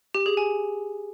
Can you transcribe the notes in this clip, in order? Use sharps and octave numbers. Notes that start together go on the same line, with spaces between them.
G4
G#4
G#5